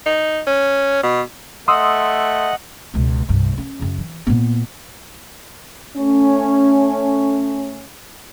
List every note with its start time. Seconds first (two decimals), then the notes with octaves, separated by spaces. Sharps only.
0.06 D#4
0.47 C#4
1.03 B2
1.68 A3 D#5 F#5 C6 D#6 E6
2.94 C#2 B2
3.29 C2 G2
3.58 C#4
3.80 F#2 C#3
3.98 E3
4.27 A#2 B3
5.97 A3 C#4